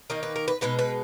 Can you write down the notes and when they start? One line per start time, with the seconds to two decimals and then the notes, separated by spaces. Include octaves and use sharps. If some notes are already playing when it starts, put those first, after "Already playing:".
0.10 D#3 A#3 D#4 D#5
0.23 B4
0.36 A#4
0.48 B4
0.61 B2 G#3 D#4 B4
0.79 B4